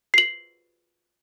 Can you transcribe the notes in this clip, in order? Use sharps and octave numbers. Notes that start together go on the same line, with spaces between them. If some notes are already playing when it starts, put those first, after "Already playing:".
C7 F#7